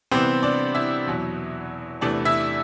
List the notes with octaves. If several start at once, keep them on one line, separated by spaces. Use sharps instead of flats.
C3 E3 G3 B3 C4 C5
D4 D5
E4 E5
E2 B2 F#3
E2 C3 E3 A3 D4 D5
E4 E5